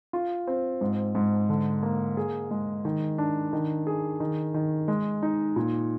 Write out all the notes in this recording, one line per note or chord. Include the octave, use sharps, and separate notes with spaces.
F4
C4
G#2
G#2
D3
A#3
G#4
G#3
D#3
D4
D#3
G#4
D#3
D#3
G#3
D#4
A#2